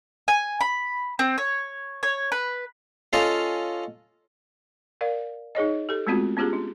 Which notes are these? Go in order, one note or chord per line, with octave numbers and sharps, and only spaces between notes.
G#5
B5
C4
C#5
C#5
B4
C#4 F4 A4 D#5 F5
A#4 D5 F5
D#4 G#4 C#5 D#5
G4 A4
G#3 A3 B3 C4 F4 F#4
B3 C#4 F4 G4 G#4
D4